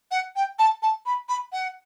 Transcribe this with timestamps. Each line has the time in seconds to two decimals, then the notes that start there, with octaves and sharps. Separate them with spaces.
0.11 F#5
0.36 G5
0.59 A5
0.82 A5
1.06 B5
1.29 B5
1.52 F#5